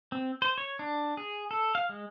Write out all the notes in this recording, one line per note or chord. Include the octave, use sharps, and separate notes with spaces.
C4
C5
C#5
D4
G#4
A4
F5
G#3